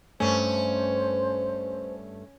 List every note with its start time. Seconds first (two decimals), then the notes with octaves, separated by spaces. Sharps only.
0.20 G2 A3 C#4 C5